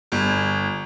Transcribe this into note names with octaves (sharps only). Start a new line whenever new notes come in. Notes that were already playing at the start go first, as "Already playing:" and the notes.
G1